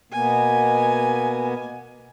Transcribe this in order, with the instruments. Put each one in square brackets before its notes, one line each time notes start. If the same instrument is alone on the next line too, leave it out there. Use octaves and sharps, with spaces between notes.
[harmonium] B2 A#3 B3 [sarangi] G#5